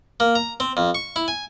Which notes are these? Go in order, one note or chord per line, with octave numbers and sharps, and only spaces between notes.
A#3
A#5
C4
F2
C#6
E4
G#5